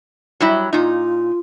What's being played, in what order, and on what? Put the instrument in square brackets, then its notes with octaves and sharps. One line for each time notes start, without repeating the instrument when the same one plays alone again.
[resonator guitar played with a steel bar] F#3 G3 E4
[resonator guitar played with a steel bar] A#2 D#4 [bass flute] F4